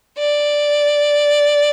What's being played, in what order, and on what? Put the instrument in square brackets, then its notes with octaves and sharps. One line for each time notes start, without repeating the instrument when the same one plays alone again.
[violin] D5